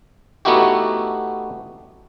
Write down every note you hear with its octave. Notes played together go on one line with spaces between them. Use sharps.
A3 B3 D#4 E4 F#4 G4